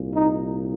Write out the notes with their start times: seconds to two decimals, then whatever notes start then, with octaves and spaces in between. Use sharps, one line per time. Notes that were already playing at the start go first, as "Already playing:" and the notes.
Already playing: C2 A#2
0.13 D#4